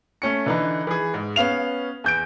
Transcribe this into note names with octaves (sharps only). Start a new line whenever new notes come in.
A3 C#4 C#7
D3 E3 D#4
E3 G#4
G#2
B3 C#4 F5 F7
E2 G6 D7